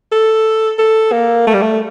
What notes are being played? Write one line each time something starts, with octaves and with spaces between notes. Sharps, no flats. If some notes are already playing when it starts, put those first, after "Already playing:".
A4
A4
A#3
A3
G3
A3